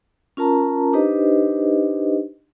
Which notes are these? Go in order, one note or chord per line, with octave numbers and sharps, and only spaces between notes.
C#4 F4 A#4 A5 A#5
D4 D#4 G4 B4 C5 D#5